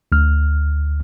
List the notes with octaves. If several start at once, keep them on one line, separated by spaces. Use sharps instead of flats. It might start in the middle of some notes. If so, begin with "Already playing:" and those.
D2 F6